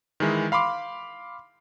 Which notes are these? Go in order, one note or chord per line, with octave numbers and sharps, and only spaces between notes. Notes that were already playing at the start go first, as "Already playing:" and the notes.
D#3 E3 G#3 E4
F5 B5 C6 D6